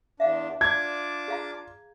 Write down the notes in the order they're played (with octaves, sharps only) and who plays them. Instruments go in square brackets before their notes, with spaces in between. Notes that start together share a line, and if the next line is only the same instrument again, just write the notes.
[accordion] E2 D4 [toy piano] E5 F5
[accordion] D4 A5 D6 [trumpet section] F4 D5 [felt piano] G#6
[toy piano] G#4 F5 A#5